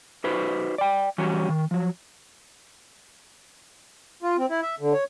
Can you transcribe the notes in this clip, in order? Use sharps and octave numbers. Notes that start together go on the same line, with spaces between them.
D#4 F#4 B4 C5
D5 G5
E3 G3 C#4 F#4
D#3
F3 F#3
F4
C4
E4
E5
D3
C#5